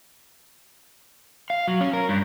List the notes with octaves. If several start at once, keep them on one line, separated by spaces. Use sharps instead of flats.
F5
F#3
C#4
A#4
G2